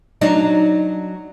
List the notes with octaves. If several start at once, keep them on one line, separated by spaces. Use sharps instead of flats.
F#3 D4 D#4